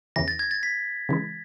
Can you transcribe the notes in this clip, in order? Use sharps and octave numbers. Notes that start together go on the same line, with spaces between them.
E2 C#3 E3 A#6
A6
G#6
A6
B6
C#3 E3 G#3